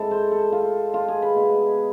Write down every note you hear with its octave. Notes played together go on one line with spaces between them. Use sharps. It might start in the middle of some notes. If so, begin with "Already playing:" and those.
Already playing: G#2 G#3 C4 E4 A4
C5
A4
F4
F4
G#4
B4
B2 B3 E4